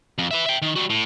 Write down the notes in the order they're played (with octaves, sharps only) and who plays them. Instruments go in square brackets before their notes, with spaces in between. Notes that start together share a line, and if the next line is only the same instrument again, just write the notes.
[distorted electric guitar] F2
B4 E5
E5 G5
D#3
G3 F#4
A2